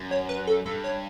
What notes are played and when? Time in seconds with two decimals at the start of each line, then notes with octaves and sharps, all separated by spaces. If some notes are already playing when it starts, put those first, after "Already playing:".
Already playing: F#2
0.11 C#5
0.29 B4
0.47 A4
0.66 G2 A4
0.84 C#5